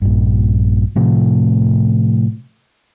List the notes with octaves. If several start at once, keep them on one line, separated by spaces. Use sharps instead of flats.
A#1 G2
A2 C3 F3 A3